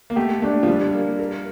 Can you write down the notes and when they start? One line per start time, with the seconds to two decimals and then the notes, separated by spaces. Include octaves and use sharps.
0.10 A#3
0.16 A3 G4
0.42 A3 D4
0.63 F3
0.67 G3 D4
0.94 A#3
1.19 A#4